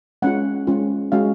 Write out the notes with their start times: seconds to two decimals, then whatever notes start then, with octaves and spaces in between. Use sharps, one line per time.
0.22 G#3 C#4 F4 F#5
0.67 G#3 C#4 F4
1.12 G#3 C#4 F#4 F5